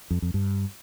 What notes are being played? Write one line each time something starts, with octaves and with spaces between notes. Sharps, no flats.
F2
F2
G2